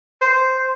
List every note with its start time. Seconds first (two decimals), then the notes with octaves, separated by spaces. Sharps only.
0.21 C5